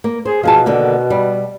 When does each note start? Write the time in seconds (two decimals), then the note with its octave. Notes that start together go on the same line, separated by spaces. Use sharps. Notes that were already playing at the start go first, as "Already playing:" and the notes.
0.04 A#3
0.25 G#4 C5
0.43 B2 F3 G#4 A5
0.66 D3 D#3 A#3
1.10 G3